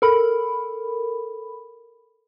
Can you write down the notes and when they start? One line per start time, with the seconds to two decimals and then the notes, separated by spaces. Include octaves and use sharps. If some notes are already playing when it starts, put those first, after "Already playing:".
0.02 A4 A#4 B5